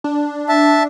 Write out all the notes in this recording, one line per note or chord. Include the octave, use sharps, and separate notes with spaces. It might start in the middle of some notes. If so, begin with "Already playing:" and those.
D4
E5 A5